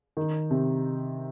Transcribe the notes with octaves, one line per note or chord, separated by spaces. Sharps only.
D#3
C3